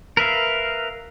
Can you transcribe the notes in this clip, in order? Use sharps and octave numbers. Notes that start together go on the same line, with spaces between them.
A#4 B4 E5 F5